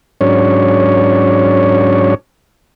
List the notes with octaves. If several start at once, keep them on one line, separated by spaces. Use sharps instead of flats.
G#2 F#3 C#4 D4 C#5